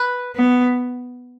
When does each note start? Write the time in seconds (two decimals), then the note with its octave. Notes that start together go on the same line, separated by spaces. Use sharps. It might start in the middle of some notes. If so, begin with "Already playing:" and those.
Already playing: B4
0.36 B3